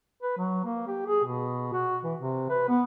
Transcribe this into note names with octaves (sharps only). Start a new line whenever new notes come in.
B4
F#3
A#3
G4
G#4
B2
F#4
E3
C3
B4
B3